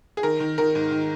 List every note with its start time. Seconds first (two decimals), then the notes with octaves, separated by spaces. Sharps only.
0.17 G#4
0.23 D#3 A#4
0.40 D#3
0.58 D#3 A#4
0.75 G#2
0.92 D#3